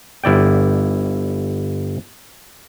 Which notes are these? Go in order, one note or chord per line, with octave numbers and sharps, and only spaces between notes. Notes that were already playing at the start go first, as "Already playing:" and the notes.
G1 E4 D5 G5